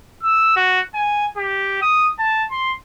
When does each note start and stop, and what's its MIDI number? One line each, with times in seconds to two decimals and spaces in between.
0.23 0.54 88
0.56 0.80 66
0.94 1.27 80
1.37 1.81 67
1.82 2.10 87
2.19 2.46 81
2.51 2.73 84